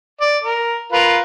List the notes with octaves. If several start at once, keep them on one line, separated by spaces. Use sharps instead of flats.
D5
A#4
F4 A#4 B4